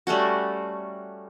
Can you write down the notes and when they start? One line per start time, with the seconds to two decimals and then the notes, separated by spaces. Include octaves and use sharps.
0.07 G3 A3 C#4 F#4